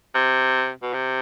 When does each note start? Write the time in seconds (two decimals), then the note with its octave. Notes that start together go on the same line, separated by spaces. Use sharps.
0.14 C3
0.82 B2
0.93 C3